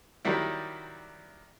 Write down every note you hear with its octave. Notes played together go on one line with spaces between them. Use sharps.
D#3 F#3 G3 E4